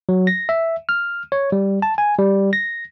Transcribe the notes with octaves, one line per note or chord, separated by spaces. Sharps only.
F#3
A#6
E5
F6
C#5
G3
A5
G#5
G3
A#6